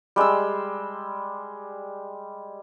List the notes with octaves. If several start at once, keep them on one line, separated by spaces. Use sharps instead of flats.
G3 G#3 A5 E6